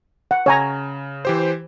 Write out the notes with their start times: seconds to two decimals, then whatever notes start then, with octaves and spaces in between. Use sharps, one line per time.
0.31 F#5
0.46 C#3 C#5 G#5 A#5
1.25 E3 G4 C5